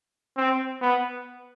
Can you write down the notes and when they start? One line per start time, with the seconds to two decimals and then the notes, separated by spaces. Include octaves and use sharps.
0.37 C4
0.81 B3